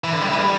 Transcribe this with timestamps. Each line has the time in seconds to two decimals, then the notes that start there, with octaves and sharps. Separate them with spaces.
0.04 E3
0.13 D3
0.21 G3
0.29 E3
0.38 G3